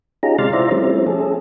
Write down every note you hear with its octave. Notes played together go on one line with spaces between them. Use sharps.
C#4 D#4 F4 G4 G#4 A#5
C3 G#3 D5 C6 F6 A6
E4 F4 C5 D5 E5 A#5
F3 G3 A3 C4 C#4 E4
C#4 G#4 A4